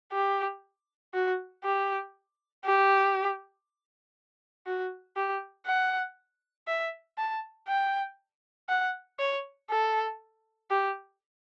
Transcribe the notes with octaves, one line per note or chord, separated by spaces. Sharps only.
G4
F#4
G4
G4
F#4
G4
F#5
E5
A5
G5
F#5
C#5
A4
G4